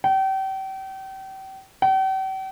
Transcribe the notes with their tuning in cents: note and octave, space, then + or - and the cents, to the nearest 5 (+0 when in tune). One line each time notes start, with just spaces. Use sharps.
G5 -35
G5 -45